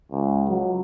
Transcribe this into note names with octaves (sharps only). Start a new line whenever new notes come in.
C#2
F#3